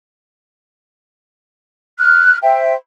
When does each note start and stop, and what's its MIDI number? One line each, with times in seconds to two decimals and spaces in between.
1.99 2.38 89
1.99 2.38 90
2.43 2.74 72
2.43 2.74 76
2.43 2.74 79